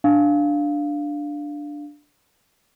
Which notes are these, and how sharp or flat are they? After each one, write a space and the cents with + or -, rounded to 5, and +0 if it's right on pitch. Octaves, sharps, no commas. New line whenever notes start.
D4 +0 F5 +0